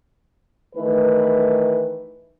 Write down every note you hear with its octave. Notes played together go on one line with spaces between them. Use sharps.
D#3 E3 A3 B4